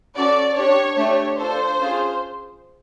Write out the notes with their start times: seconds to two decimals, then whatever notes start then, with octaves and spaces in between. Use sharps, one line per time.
0.16 C#4 F#4 A4 D5
0.57 D4 G4 C#5
0.97 A3 D4 G4 C#5
1.38 D4 F4 A4 C5
1.79 C#4 F4 G#4